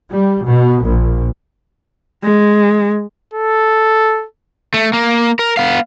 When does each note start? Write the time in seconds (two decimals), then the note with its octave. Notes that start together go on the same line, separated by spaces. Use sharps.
0.11 G3
0.46 B2
0.84 A#1
2.24 G#3
3.34 A4
4.74 A3
4.93 A#3
5.39 A#4
5.57 B3 F5